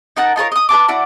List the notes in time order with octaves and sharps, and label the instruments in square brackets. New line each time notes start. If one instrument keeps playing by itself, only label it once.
[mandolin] D#4 A#4 F#5 A5
D#4 F4 A#4 C#5
D#5 D#6
B4 D#5 A5 D6
E4 F#4 D5